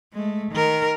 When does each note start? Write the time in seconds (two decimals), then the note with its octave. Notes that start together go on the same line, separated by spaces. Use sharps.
0.13 G#3 A3
0.51 D#3 A#4